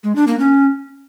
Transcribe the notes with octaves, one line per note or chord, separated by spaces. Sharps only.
G#3
D4
A#3
C#4